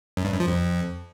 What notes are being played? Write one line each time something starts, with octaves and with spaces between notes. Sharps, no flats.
F#2
G2
F#2
F3
F2